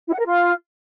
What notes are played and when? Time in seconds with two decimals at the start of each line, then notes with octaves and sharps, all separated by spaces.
0.08 E4
0.14 F#5
0.20 A#4
0.26 F4